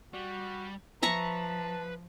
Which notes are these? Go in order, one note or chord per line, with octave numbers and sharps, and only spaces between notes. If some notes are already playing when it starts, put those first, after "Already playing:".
G3 F#4
F3 B4 E5 A5 A#5 C#6